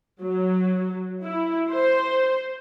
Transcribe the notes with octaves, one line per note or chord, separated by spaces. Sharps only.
F#3
E4
C5